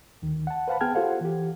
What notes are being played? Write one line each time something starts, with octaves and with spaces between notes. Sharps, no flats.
D2 D#3
F#5 A5
B4 C5 F5 F#5 A5 B5
B3 G#4 G5 A5 F6 G#6
F4 G4 A4 C5 F5 F#5
E3 G4